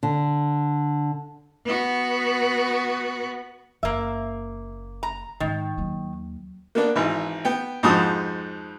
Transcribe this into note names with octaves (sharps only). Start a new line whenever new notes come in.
D3
B3 F#4
F#1 A#3 E5
A#5
G#2 D#3
D#2 F#3
A#3 B3 D4
G#1 E3
B3 G5
F2 G#2 F3 F#4 A5 D#6